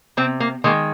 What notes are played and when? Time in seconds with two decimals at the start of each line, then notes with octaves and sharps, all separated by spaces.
0.17 C3 C4
0.40 A#3
0.64 D#3 G#3 A#3